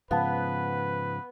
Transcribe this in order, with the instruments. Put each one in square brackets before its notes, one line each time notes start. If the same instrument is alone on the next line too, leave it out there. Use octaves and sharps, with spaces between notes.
[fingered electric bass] G#2 C#3 F3 [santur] B3 [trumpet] B4 [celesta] F5 A5